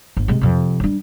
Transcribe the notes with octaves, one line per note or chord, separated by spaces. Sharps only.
G1
C3 G#3
F2 C3
G3 D4